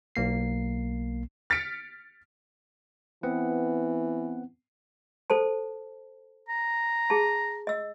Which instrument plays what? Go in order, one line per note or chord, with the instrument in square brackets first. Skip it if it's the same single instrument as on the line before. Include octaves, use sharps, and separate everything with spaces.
[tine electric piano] B1 A#3 C7
[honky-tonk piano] F6 A6 B6 C#7 D7
[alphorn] E3 [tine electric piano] B3 C4 F#5
[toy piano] A4 C5 A5
[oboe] A#5
[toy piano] G#4 A5
D#5 E6